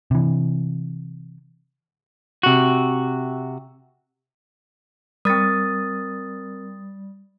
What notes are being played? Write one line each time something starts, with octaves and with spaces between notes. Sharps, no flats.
C3 E3
C3 F#4
G3 C4 A#4 D#6 A6